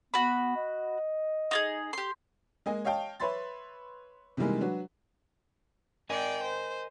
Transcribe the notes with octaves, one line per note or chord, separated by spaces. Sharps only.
B3 F#4 B5
D#5
D#4 F4 G#4
G4 C6
G#3 A#3 D#5 G#5
C#5 D#5 F5 G5 A5
B4 C#5 E5 B5 C6 A6
C3 D#3 E3 G3 G#3 A#3
F#3 D4 F#4 B4
A#4 D5 D#5 G5 G#5
C5